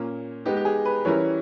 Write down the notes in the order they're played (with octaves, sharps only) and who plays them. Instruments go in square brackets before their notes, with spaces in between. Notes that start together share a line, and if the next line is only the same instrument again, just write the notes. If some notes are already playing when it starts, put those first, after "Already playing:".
Already playing: [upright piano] A#2 A#3 C#4
[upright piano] G#3 B3 D#4 [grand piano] G4
[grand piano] G4
G#4
B4
[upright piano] E3 G3 C#4 E4 A#4 [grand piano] C#5